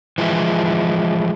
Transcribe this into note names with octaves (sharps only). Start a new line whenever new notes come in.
E3 F3 G#3 E4